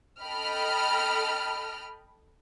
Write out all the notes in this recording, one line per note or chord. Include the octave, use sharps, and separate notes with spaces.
A4 D#5 G5 B5 F6